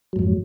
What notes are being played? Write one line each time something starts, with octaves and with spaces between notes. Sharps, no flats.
F2 G#2 F#3